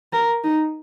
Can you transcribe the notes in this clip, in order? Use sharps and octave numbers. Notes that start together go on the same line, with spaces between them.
A#4
D#4